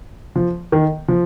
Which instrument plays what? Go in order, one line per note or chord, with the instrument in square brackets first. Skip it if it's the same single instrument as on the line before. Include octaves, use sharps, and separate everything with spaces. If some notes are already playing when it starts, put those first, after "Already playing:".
[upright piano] F3
D#3
F3